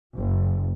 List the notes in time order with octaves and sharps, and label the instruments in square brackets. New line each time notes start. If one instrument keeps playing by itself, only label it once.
[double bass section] F#1